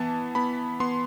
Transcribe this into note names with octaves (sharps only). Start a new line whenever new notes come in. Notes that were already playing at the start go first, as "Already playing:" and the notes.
Already playing: E3 B3 A5
B3 B5
B3 C6